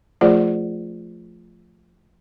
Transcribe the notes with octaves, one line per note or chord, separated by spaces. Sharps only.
F3 A3 F4 G#4 C5 D5